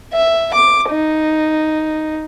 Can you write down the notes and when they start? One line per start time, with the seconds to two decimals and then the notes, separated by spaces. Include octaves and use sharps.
0.13 E5
0.54 D6
0.90 D#4